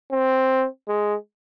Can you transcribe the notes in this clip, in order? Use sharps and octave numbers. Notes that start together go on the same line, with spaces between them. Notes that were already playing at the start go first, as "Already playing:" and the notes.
C4
G#3